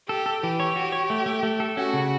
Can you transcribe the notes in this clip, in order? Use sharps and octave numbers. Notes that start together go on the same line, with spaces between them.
G4 A4
A4
E3 G4
C#5
F#4
C#5
A3
A3
A3
A4
C#4 F#4
C#3